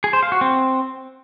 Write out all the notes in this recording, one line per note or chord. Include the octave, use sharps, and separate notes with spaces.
G#4
C5
F5
F#4
C4